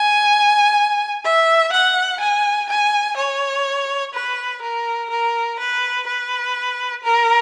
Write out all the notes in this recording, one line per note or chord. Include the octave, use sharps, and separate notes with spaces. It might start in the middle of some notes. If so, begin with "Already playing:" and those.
Already playing: G#5
E5
F#5
G#5
G#5
C#5
B4
A#4
A#4
B4
B4
A#4